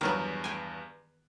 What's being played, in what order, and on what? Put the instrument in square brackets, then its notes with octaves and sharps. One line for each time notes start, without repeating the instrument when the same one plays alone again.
[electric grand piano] E2 G2 F6 [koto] D#3 F#3 B3
[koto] G5 G#5